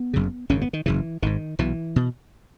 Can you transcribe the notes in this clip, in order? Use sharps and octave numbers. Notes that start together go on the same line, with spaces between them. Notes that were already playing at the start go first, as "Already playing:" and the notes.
Already playing: B3
F#1 F#2 C#3
G#1 F#2 C#3 C#4
B3
D#3
F#1 F#2 C#3 E3
G#1 G#2 D#3
B1 B2 E3
B2